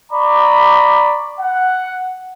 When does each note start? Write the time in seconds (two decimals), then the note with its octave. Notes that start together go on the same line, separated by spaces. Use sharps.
0.12 D5 A#5 B5 C#6 D6
1.40 F#5